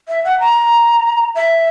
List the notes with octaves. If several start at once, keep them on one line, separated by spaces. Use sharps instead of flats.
E5
F#5
A#5
E5